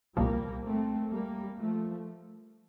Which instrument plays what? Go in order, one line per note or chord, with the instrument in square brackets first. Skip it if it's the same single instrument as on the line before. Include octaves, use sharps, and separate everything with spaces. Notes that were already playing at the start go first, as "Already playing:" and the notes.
[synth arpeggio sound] C2 A#2 F3 [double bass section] G3 A#3
[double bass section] A3 C4
G3 A#3
F3 A3